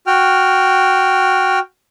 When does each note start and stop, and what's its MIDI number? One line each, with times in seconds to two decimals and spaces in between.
0.07 1.59 66
0.07 1.59 79
0.07 1.59 89